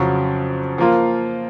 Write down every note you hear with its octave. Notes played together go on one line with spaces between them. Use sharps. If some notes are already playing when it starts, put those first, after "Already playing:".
Already playing: F2 C#3 F#3
F3 A#3 F4